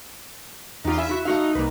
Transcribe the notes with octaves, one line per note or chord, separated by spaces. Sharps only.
E2 D#4 F4 G4
E4 E5 G#5
E4 F#4
A3 D#4 F#4 F5
C2 A#3 B4